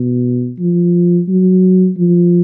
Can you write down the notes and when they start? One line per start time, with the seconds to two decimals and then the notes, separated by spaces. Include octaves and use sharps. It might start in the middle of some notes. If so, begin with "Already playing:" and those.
Already playing: B2
0.59 F3
1.28 F#3
1.97 F3